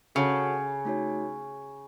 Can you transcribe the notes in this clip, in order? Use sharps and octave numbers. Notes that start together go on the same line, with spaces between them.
C#3 F#4 A4 C#5 F#5 A5
A3 D#4 F#4 C#5